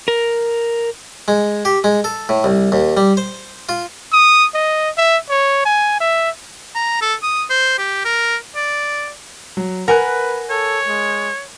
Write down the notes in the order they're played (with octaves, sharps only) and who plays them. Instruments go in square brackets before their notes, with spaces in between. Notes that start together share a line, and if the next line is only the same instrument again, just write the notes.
[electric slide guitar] A#4
[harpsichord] G#3
G4
G#3
A4
A2
C2
D#2
G3
C5
F4
[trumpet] D#6
D#5
E5
C#5
G#5
E5
[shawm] A#5
A4
D#6
C5
G4
A#4
D5
[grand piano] F#3
[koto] A#4 [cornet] B4 [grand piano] F#5 G#5 F#6
[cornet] A4 [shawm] C#5
[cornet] G#3